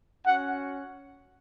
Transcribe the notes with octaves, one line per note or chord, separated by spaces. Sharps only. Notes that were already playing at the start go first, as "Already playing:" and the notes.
C#4 F#4 F#5